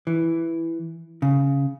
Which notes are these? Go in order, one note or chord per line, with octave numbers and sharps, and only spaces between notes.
E3
C#3